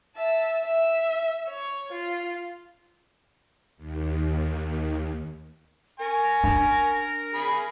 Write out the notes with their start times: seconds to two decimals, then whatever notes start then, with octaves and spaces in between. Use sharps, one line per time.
0.16 E5 A5
0.64 E5
1.48 C#5
1.92 F4
3.77 D#2
5.99 A#4 G#5 C#6
6.44 D4
7.34 G#4 B5